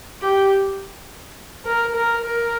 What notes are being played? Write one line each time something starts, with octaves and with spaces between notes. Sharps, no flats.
G4
A#4
A#4
A#4